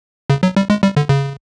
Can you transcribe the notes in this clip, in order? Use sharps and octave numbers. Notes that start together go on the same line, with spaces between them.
C#3
F#3
G3
G#3
G3
D3
C#3